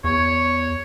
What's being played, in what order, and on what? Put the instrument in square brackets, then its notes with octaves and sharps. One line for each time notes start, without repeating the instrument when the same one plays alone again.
[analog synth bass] E2 [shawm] C#5